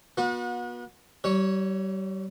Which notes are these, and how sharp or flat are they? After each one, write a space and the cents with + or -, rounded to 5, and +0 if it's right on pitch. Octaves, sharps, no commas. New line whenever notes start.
B3 -35 F#4 -40
G3 -35 C#5 +0